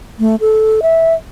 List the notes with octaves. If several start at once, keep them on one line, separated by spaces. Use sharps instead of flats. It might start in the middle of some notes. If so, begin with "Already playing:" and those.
A3
A4
E5